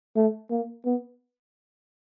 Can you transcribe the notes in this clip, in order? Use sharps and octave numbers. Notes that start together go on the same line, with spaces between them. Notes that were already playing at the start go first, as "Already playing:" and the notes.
A3
A#3
B3